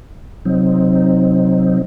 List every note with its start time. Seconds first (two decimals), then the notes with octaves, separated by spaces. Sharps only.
0.45 C3 F#3 C4 D#4